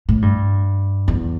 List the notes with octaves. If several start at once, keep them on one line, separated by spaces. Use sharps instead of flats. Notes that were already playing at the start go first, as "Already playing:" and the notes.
A2
G2
E2